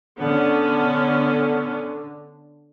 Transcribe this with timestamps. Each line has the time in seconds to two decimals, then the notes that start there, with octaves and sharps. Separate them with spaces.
0.19 D3 B3 C#4